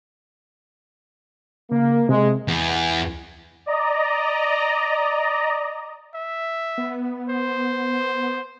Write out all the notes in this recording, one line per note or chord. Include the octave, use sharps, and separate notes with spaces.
C#3 A#3
C3 G#3
E2
D5 D#5 A#5
E5
B3
C5